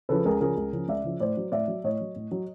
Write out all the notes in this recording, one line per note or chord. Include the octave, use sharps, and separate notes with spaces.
C#3 F3 A4 B4
C#2 G#4 A#4
C#3 F3 G#4 A#4
C#2
C#3 F3
C#2 D5 E5
C#3 F3
A2 C5 D5
F#3
A2 D5 E5
F#3
A2 C#5 D#5
F#3
A2
F#3